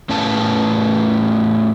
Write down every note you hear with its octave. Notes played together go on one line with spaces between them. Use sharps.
A2 A3 B3 C#4 F5 A5